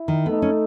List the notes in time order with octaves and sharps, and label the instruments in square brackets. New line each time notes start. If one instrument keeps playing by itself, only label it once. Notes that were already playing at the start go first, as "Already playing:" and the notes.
Already playing: [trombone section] E4
[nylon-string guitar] D#3
[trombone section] A3 D#4 A4 [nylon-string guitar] B3
[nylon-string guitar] C#4